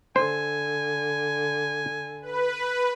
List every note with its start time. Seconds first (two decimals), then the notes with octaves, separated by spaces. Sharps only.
0.16 D3 C5 G#5
2.22 B4